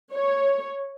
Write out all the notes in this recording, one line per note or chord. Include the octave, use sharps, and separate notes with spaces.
C#5